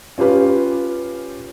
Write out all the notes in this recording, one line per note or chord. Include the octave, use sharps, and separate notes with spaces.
C#4 F4 G4 B4